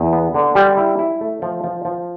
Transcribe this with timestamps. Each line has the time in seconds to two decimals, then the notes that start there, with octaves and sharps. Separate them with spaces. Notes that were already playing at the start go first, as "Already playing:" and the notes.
Already playing: E2
0.13 B3
0.34 D3
0.55 G3
0.77 E4
0.99 E4
1.21 A3
1.42 F3
1.64 F3
1.85 F3